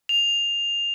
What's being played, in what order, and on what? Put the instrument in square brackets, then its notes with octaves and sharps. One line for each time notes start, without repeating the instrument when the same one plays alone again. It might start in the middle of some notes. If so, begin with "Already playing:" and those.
[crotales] F7